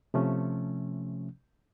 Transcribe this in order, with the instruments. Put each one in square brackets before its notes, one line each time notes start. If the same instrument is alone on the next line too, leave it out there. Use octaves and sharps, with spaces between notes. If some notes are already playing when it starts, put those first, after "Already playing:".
[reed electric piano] C3 F3 A3 C#4